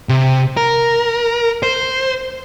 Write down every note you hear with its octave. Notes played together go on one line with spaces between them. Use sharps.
C3
A#4
C5